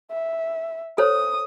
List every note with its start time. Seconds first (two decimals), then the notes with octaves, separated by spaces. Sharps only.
0.11 E5
0.98 A4 C5 C#5 D#6